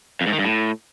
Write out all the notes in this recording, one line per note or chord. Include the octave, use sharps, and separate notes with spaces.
F2
G#2
D#3
G2
A2